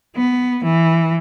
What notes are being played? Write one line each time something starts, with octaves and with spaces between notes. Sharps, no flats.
B3
E3